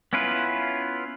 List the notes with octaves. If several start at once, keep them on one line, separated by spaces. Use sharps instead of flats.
B3 C#4 E4 F4 B4